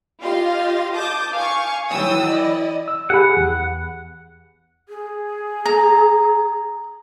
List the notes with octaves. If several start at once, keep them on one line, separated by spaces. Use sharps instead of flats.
F4 G4 D#5 F5 C6
A5 D6 D#6 G6
F5 G#5 C#6
E3 F#3 G5 D#6 E6
E4 D5 D#5
E6
G4 G#4 F#5 B5
E2
G#4
A#5